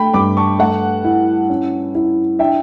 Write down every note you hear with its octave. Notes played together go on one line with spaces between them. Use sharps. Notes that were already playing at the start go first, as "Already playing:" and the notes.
Already playing: A3 G5 B5
G2 B5 D6
A5 C#6
A3 F#5 A5
E4
C#4
E4
D4 E5 G5